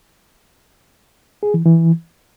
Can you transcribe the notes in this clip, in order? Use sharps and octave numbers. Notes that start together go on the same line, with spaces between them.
G#4
E3
E3